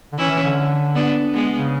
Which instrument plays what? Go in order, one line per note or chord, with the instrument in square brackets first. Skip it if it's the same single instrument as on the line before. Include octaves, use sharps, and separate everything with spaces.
[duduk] D3
[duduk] E3 [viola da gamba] C#4 E4
[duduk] E3
D3
[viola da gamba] B3 D4
G#3 B3
[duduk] C#3